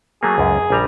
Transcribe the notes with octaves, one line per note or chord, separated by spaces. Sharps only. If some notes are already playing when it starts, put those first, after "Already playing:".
F#3 A3 A#3 G#4
C#2 F#2
A#1 G3 A#5